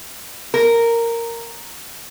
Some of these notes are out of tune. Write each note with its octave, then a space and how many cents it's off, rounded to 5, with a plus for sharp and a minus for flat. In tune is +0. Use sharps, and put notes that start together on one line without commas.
A#4 -10